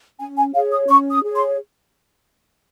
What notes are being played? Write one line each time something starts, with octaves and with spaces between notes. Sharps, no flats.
C#4 G#5
G#5
G#4 C#5 F5
D#6
C#4 C#6
D#6
G#4 C#5
C6